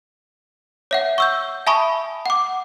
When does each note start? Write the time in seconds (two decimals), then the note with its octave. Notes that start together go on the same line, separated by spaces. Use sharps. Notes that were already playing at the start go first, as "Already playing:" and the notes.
0.91 C#5 E5 F#5
1.18 C#6 E6 G6
1.67 E5 G#5 A5 B5 C#6 D#6
2.26 F#5 D6